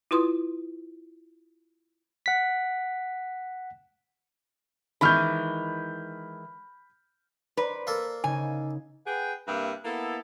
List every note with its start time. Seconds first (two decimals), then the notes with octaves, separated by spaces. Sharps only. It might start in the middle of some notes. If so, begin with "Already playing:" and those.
0.11 E4 F4 B4 C6 D#6
2.26 F#5 B6
5.01 D#3 E3 G#3 B5 F6 G6
7.57 B4 C5 D5 A#5
7.87 A#3 A4
8.24 C#3 D#4 G#5
9.06 G#4 B4 F#5 G5
9.48 G2 C3 A#3 G4 E5
9.85 A#3 B3 E4 A4